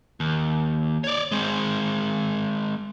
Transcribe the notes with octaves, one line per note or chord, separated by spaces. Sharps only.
D#2
C#5 D5
G#3 C4